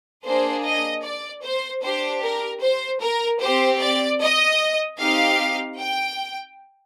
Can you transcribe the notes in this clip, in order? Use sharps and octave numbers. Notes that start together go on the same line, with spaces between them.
A#3 D4 G#4 C5
D#5
D5
C5
D4 G4 C5
A#4
C5
A#4
C4 G4 C5
D5
D#5
C4 D#4 G4 F5
G5